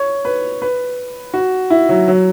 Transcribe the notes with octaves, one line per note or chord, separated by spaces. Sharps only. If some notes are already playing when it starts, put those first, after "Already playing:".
Already playing: C#5
B4
B4
F#4
E4
F#3
F#3